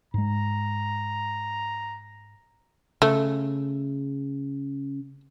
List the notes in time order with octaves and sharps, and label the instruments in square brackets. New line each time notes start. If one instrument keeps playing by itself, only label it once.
[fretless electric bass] G#2 G#3 [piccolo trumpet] A#5
[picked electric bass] C#3 [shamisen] A3